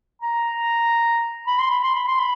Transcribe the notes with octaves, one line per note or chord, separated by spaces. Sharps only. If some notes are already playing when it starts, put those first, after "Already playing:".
A#5
B5
C6
B5
C6
B5
C6
B5